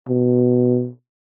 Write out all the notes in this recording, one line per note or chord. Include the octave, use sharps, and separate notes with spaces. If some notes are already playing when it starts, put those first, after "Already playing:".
B2